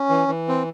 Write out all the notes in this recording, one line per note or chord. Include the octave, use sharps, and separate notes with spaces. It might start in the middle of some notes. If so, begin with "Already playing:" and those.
Already playing: C#4
E3
E3
C4